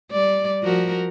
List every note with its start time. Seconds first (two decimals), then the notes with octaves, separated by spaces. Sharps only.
0.11 G3 D5
0.63 F3 F#4 A#4